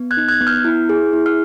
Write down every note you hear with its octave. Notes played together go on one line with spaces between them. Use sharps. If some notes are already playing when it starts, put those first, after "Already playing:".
Already playing: B3
F#6 G#6
D#4
F#6 G#6
B3
F6 G6
E4
G#4
E4
F6